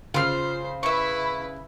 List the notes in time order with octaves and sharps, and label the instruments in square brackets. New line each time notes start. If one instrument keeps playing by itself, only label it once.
[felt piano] C#3 C6 C7 [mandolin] F4 F6 [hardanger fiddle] C5
[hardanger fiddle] E4 B4 [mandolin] E5 C#6